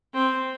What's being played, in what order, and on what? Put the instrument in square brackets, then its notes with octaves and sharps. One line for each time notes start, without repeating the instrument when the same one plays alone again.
[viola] C4